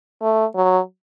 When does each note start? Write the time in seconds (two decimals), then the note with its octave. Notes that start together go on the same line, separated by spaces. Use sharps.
0.22 A3
0.56 F#3